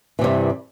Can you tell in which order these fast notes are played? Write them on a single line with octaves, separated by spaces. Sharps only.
E3 C3 G2